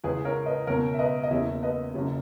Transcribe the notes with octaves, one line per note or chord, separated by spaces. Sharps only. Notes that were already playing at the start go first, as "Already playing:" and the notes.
C#2 C#3 E3 G#4 B4
A#4 C#5
B4 D#5
C#2 B2 A#4 C#5
E5
B4 D#5
D#5
F#1 E2 C#3 E3 C#5 E5
B4 D#5
F#1 F#2 C#3